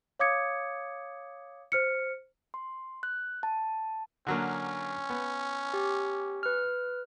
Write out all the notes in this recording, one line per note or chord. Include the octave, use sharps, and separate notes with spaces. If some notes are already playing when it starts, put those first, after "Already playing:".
C#5 F5 D6 D#6 G#6 C#7
C5 F6 C#7
C6
F#6
A5
D3 F#3 A#3 C#4
B3
G4
B4 F6